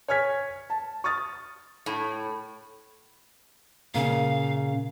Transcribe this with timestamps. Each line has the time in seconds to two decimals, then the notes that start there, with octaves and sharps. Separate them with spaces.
0.08 C#5 G#5 F6 G#6 B6
0.70 A5
1.04 C#6 D#6 F6 A6
1.86 A2
3.94 A#2 C#3 F5